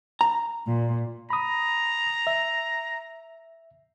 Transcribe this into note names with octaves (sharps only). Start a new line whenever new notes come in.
A#5
A#2
A#5 B5 D#6
E5